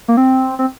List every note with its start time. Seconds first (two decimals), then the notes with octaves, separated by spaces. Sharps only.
0.08 A#3
0.17 C4
0.59 C4